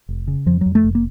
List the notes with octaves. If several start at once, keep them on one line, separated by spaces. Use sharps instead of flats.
F1
C#3
F2 F3
F2 F#3
A3
F1
A#3